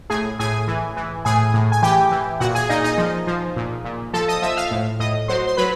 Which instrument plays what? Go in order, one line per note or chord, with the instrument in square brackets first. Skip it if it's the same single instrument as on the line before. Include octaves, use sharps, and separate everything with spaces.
[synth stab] A2 G#4 G#5
A2 G#4 G#5
E3
E3
A2 G#4 G#5
A2
G#5
E3 G4 G5
E3
A#2 F#4 F#5
G#4 G#5
A#2 D#4 D#5
D#4 D#5
F3
F3
A#2
A#2
F3 A4 A5
D#5 D#6
F3 E5 E6
F5 F6
A2
A2 D#5 D#6
F#3 C5 C6
C6
F#3 B4 B5